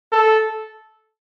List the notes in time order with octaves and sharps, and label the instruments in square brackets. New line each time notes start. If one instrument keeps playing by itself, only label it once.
[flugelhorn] A4